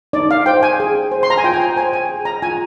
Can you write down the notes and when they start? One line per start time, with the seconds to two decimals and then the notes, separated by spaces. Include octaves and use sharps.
0.13 D#4 D5
0.31 F5
0.46 C5 G5
0.63 G#5
0.80 G#4
1.11 C5
1.23 C6
1.30 A#5
1.38 G#5
1.44 F4 G5
1.54 G#5
1.60 G5
1.76 C5 G#5
1.93 G#5
2.10 G#4
2.25 A#5
2.42 F4 G#5